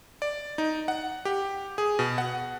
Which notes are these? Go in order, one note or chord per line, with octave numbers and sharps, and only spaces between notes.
D5
D#4
F#5
G4
G#4
B2
F#5